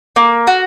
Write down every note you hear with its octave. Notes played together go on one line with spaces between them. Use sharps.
A#3
F#4